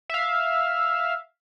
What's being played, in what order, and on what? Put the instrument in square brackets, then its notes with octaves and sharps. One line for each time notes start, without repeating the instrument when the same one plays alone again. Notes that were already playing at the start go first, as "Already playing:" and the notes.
[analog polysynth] E5 F5